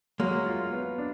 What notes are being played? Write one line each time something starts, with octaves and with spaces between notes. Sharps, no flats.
F#3 G#3 A#3
F4
B3
D4